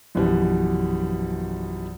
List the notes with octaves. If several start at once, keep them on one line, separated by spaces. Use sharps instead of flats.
A#1 F#2 B2 E3 G3